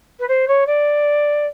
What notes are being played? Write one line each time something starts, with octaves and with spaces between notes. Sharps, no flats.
B4
C5
C#5
D5